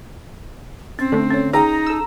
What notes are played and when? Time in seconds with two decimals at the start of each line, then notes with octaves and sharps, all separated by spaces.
0.99 C4 C#4
1.12 D3 A3 A4
1.31 C#4 C#5
1.53 D#4 G#4 G5 A#5
1.87 A4 E6